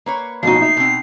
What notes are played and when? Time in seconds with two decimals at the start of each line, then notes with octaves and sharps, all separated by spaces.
0.06 A#3 B4 C#5
0.43 A1 B2 F3 D#4 F#4 C7
0.62 D#4 E5
0.77 B2 C4